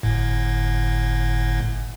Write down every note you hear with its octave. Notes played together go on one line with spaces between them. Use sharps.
G1 A2